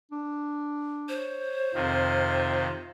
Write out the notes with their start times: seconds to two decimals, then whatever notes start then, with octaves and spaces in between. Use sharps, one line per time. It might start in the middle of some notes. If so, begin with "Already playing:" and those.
0.11 D4
1.09 C5 C#5
1.74 F2 C3 D#3 F4